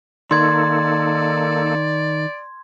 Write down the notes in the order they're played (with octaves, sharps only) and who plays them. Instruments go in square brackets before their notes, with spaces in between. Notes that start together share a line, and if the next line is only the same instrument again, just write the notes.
[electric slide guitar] D#3 [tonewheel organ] A#3 D#4 A4 [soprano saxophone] D5 [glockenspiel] C6 G#6